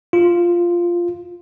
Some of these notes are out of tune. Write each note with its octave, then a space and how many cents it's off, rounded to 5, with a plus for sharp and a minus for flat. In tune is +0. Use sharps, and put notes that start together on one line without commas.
F4 -5